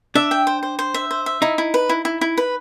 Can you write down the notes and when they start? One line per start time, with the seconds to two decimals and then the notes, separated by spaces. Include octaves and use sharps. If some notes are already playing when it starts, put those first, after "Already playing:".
0.15 D4 E5
0.31 G5
0.47 C5
0.63 C5
0.79 C5
0.94 E5
1.11 C5
1.26 E5
1.42 D#4 E4
1.58 E4
1.74 B4
1.89 E4
2.05 E4
2.21 E4
2.37 B4